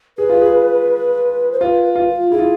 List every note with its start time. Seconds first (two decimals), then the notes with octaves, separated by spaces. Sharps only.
0.18 G#4 B4
0.29 F4
0.42 G#4
1.52 C5
1.60 F4 B4
1.84 B4
1.95 F4
2.08 F4
2.31 E4 G#4
2.39 F4